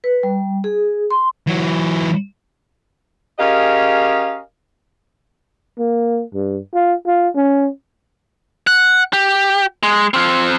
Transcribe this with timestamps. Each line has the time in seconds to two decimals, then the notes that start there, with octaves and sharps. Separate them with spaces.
0.04 B4
0.23 G3
0.64 G#4
1.10 C6
1.47 E3 F#3
3.39 C#4 G4 G#4 A#4 D#5 F5
5.78 A#3
6.34 G2
6.74 F4
7.06 F4
7.36 C#4
8.67 F#5
9.13 G4
9.83 G#3
10.14 C4 F4